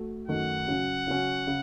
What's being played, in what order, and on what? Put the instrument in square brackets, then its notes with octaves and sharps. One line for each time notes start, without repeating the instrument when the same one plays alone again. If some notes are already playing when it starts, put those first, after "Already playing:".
Already playing: [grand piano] A3 F#4
[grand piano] F#2 D#3 A3 D#4 F#4 [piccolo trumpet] F#5
[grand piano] C#3 F#3 C#4 F#4
C#3 F#3 C#4 F#4
C#3